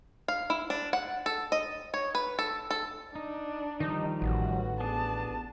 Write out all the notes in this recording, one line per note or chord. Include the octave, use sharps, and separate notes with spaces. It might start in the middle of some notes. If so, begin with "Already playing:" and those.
F5
E4
D4
F#5
A4
D#5
C#5
B4
A4
A4
D4 D#4
D#3 F3 G3 D#4
A1 F#4
B3 D4 G#4 A5